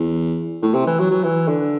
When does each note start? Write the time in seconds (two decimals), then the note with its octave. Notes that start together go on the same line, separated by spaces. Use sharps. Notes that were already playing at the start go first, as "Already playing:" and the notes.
Already playing: E2
0.62 A2
0.74 C3
0.87 E3
0.99 F#3
1.11 F#3
1.23 E3
1.48 D3